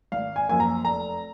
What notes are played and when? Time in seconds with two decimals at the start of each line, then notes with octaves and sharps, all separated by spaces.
0.12 G#1 F5
0.36 G#5
0.49 F#2 F3 A#3 G#5
0.60 A#5
0.84 F1 A#5